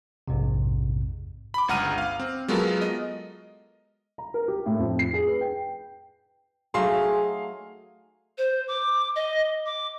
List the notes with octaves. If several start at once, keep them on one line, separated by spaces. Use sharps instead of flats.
A#1 F2 G#2 C3
B5 D6
G1 C#2 F#5 A#5 F6 D#7
F5
C4
F#3 G#3 B3 F4 A4 A#4
D#5
A#5
A#4
G4
A2
F2
C7
G#4
B4
G5
F#3 A3 D#4 G#4 F5 C6
C5
D6
D#5
D6